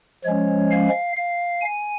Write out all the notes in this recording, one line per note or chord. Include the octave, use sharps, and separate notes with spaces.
F3 G#3 C#4 C#5
F5
F5
G#5